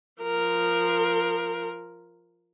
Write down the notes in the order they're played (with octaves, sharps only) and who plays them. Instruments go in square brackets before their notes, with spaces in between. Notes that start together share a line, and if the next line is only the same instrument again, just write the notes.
[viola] F3 A#4